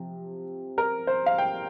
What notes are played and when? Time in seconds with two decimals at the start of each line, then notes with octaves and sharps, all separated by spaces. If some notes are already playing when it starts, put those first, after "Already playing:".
Already playing: C3 F3
0.78 A#4
1.07 C5
1.26 F5
1.38 G5